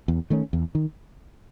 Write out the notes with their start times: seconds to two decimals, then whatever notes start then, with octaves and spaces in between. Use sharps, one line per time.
0.08 E2
0.30 D#3 A3 C#4
0.53 E2
0.75 D#3